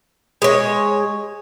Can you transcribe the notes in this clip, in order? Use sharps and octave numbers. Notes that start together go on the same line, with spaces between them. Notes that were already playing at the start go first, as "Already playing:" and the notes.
G#3 C#5